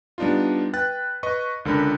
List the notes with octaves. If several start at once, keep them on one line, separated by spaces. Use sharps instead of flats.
G3 B3 D4 D#4 F4
B4 G5 F#6 A6
B4 D#5 C#6
C#2 D3 A#4 B5